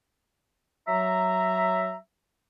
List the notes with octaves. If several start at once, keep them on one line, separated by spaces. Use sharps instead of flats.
F#3 E5 A#5